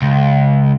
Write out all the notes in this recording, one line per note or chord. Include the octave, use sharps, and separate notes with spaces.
C#2